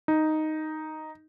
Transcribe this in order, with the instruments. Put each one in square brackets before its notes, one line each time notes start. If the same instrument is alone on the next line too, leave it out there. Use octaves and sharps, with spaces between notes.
[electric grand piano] D#4